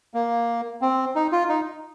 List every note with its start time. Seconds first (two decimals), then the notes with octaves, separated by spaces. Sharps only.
0.14 A#3
0.82 C4
1.16 D#4
1.32 F4
1.49 D#4